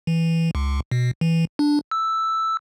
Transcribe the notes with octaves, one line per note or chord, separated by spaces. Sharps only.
E3
C#2
B2
E3
D4
E6